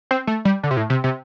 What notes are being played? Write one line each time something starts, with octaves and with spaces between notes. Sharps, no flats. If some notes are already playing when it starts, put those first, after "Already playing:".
C4
A3
G3
D3
C3
A2
C3
C3